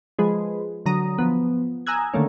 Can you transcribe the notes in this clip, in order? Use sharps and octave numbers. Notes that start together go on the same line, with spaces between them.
F3 G#3 B4
D3 F#3 A#5 D#6
F3 B3
G#5 A#5 D#6 E6 F#6 G#6
D3 D#3 A3 A#3 C#4